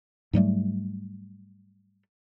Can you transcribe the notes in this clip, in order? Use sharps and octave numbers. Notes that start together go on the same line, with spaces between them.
G#2 F#3 G3 A3